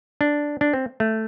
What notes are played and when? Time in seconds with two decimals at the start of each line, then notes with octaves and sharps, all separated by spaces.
0.21 D4
0.61 D4
0.74 C4
1.00 A3